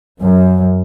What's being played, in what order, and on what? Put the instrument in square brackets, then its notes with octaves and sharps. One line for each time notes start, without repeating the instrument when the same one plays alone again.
[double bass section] F#2